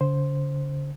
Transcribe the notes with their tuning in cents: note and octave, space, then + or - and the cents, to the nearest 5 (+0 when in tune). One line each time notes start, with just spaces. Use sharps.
D3 -45 C5 +0